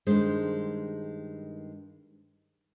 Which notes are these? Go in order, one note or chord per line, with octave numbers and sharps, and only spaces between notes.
G2 D#3 G#3 C5